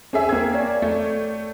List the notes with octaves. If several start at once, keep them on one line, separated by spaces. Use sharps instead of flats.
C4 C#4 G#4 E5
A#3 G#6
C#5 D5
A3